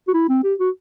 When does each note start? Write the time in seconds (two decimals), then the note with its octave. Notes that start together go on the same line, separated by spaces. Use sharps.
0.08 F#4
0.14 E4
0.29 C4
0.44 G4
0.59 F#4